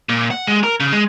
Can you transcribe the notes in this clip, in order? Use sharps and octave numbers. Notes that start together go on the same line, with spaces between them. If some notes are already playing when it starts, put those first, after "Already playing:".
A#2
F#5
G#3
A#4
C#3
G#3